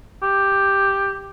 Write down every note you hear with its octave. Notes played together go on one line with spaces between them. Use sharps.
G4